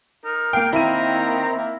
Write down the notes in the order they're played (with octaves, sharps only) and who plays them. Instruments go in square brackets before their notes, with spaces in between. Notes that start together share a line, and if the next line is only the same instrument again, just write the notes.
[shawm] D#4 [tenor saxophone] A#4
[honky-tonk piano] A#3 G5 [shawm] F5
[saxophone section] D#3 C4 [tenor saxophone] A#3 [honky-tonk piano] E4 D#7 [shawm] A#5
[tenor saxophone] A#3